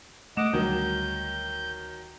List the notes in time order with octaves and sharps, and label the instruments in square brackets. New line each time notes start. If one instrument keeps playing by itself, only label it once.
[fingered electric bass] A3 [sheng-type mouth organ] D#5 F#5 D6 [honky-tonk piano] E7
[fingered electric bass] D2 G3 [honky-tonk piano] D#3 F#3 [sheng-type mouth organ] G6